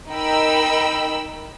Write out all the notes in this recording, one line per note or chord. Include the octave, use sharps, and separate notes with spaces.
D#4 A#4 G5 B5 E6